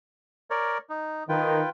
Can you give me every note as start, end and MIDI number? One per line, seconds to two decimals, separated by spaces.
0.50 0.78 70
0.50 0.78 73
0.50 0.78 74
0.89 1.24 63
1.29 1.61 51
1.29 1.69 65
1.29 1.69 71
1.29 1.69 79